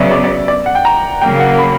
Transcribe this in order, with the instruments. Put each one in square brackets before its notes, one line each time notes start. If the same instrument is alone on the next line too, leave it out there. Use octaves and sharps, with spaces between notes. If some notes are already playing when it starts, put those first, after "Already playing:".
Already playing: [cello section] C#3 F#3 B3 [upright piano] D5 E5
[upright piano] D5
D5
D5
F#5
G5
A#5
[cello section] C#3 F#3 A#3 [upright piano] G5
[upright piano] F#5
B5